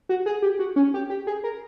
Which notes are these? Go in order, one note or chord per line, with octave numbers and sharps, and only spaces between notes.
F#4
G#4
G4
F#4
C#4
G4
G4
G#4
A#4